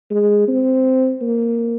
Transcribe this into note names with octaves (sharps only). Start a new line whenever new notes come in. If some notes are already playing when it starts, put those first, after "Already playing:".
G#3
C4
A#3